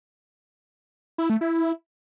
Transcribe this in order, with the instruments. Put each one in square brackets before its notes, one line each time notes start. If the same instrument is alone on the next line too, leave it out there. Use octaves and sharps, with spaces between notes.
[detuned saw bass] E4
A3
E4